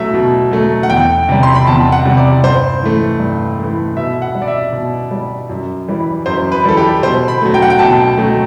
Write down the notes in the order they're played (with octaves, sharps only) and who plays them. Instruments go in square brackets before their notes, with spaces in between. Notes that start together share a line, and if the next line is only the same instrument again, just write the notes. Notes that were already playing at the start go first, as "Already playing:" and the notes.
Already playing: [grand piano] B2 F#3 A3 E5
B2
F#3 A3
F#5
E2 G5
C3 G3
C6
B5
E2 A5
F#5
C3 G3
D5
G2 C5
E3 A3
G2
E3 A3
B2 E5
F#5
G3
D5
E5
B2
G3
F#2
E3 G3
F#2 C5
B4
E3 G3 A4
G4
B2 C5
B5
F#3 A3
G5
F#5
G5
B2 A5
F#3 A3